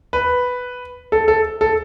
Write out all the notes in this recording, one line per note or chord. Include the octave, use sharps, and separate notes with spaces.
B4
A4
A4
A4